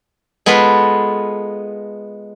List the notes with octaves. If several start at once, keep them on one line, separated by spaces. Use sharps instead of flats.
G#3 B3 F4 A4 B4